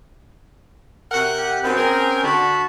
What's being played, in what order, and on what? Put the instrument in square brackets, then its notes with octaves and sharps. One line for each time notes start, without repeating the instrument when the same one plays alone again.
[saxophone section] C3 A#4 F#5
[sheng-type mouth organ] G4
[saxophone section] F#2 D#3 B3 [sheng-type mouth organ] C4 G5
[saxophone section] C#4 G#4 A#4
[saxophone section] D3 [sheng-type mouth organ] F#4 A5 B5